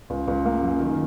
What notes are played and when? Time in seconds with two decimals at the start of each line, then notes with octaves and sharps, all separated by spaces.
0.10 C#2
0.28 C#2
0.46 A#3
0.63 F#2
0.80 D#3